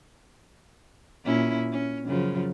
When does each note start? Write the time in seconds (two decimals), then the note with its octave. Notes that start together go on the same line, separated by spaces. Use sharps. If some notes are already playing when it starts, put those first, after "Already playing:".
1.24 A#2 C#4 E4
1.72 C#4
2.07 F#2 C#3 F3